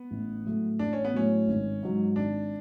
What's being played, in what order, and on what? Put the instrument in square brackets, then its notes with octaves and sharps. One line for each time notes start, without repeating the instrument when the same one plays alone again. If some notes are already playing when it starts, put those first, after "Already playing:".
Already playing: [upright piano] B3
[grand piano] A1
A2 F#3 A3
[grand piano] A1 [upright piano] D4
[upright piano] C#4
B3
[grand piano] A2 F#3 A3 [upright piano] C#4
[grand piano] G#1
G#2 F#3
[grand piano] G#1 [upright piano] D4